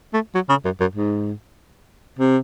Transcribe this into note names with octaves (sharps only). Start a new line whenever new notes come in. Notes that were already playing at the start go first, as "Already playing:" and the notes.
A3
F#3
C#3
F#2
F#2
G#2
C3